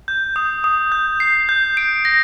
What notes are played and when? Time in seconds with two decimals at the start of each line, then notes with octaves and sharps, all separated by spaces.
0.08 G6
0.36 D#6
0.64 D#6
0.92 G6
1.20 C7
1.49 G6
1.77 D7
2.05 A#6